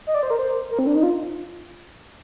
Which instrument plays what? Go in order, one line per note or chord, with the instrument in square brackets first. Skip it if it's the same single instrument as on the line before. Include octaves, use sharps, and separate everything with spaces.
[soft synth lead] D#5
D5
C5
A#4
C5
A#4
C4
D4
D#4
F4